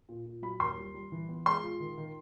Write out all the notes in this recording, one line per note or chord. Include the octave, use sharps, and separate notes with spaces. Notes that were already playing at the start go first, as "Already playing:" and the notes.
A#2
A#2
F#3 B5
D#2 C6
G3
G3
E3
B3
G#3 C6
F4
D#3
D#3